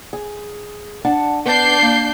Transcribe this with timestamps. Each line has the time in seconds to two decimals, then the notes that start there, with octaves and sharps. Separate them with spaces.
0.13 G#4
1.05 D4 F#5 A5
1.46 B3 D4 G6 C7
1.82 A#3